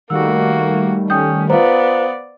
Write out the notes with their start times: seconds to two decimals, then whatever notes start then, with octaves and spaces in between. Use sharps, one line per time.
0.10 D#3 G3 A3 A#3 F#4 E6
1.10 C#4 G5 D#6 G6
1.50 B3 F4 B4 C5 D5 F5 A#5